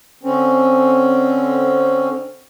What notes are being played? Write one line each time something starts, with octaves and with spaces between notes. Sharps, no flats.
D3 C4 C#4